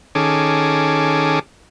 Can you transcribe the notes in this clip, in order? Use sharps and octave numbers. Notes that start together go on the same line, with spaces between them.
D#3 C#4 G#4 A4 D6